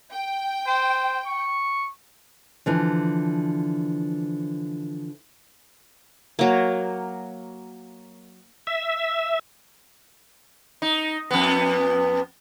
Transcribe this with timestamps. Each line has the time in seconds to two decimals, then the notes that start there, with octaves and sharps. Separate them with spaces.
0.11 G5
0.67 C5
1.26 C#6
2.66 D3 E3 F3
6.39 F#3 A#3
8.67 E5
10.82 D#4
11.31 F2 B3